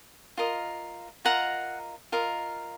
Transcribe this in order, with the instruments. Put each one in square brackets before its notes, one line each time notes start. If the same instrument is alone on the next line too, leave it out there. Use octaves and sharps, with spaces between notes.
[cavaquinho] F4 A#4 D#5
F4 A#4 D#5 F#5 A#5
F4 A#4 D#5